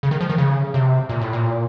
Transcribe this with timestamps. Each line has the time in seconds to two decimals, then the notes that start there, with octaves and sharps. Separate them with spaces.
0.03 C#3
0.11 D#3
0.21 F3
0.30 D#3
0.38 C#3
0.74 C3
1.09 A#2
1.21 A2
1.33 A#2